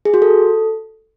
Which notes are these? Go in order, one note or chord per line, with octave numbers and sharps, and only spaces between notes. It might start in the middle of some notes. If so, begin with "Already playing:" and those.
G#4
F#4
A4